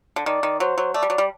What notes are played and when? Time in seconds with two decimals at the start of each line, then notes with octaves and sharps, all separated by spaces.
0.16 D3
0.26 D#3 D5
0.43 D#3
0.60 F#3 C5
0.78 F#3
0.94 A3 D5
1.03 G3
1.10 F#3
1.18 G3